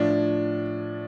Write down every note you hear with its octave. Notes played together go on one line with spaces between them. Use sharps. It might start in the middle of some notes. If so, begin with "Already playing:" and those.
Already playing: A2 F3 D4